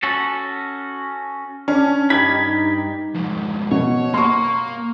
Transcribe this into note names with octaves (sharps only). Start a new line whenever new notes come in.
C#4 F#4 A4
C#4 D4
G2 D#4 G4 B5 G#6
F2 G#2
B2 C#5
A#3 C6 C#6